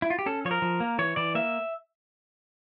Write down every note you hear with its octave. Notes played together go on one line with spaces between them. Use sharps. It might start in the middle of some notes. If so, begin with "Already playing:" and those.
E4
F4
G4
C#4 A4
F3 C#5
A#4
F3
A#3
E3 C#5
E3 D5
A#3 E5